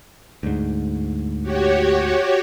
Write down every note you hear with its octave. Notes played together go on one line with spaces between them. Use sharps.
D2 G#2
F#4 G4 C#5